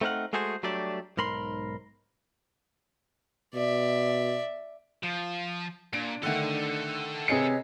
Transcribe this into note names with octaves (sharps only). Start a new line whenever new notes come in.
A3 C4 D#4 A#4 F5 F#5
G#3 A3 F#4 G#4 A4 C5
F#3 G3 A3 D4 G4 D5
B1 G#2 A#4 B5 C6
B2 D5 E5
F3
A#2 D4 D7
D3 D#3 A3 A4 F#5
C3 G#4 B4 C#5 D#5 C#7